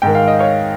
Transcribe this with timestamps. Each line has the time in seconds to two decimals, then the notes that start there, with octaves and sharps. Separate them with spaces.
0.02 G#2 D#3 G5
0.15 F5
0.28 D#5
0.39 C#5 F5